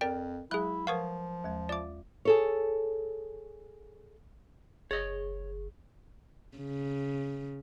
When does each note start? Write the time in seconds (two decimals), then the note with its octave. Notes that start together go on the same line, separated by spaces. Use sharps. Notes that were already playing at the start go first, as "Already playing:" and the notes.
0.01 F2 A#4 D5 G5
0.51 F#3 G#3 E4 G#4 F#6
0.87 F3 A#4 B4 F5 F#5 C#6 D#6
1.44 D#2 G#3
1.69 F4 D5 E5 F5 D6
2.25 G#4 A4 C#5
4.91 F#1 G#4 C#5 D#5
6.58 C#3